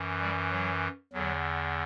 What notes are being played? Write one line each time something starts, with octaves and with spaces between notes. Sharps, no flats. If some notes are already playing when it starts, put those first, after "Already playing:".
Already playing: F#2 E3
G3
F#3
E2 D3 F#3